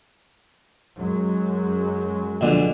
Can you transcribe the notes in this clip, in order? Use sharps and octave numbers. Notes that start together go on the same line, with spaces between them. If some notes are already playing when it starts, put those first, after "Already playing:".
F#2 F#3 G#3
A#1 B2 D3